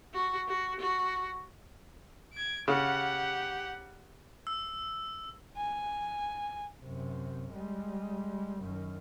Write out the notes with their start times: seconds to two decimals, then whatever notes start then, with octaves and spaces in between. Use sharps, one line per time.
0.14 F#4
0.49 F#4
0.80 F#4
2.33 G#6 D7
2.68 C#3 G4 F#5
4.47 E6
5.57 G#5
6.82 F#2 C3
7.52 G3 G#3
8.62 F#2 D#3